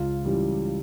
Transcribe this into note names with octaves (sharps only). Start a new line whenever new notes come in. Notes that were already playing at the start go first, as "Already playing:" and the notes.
Already playing: C#2 F4
C#3 E3 G3 G4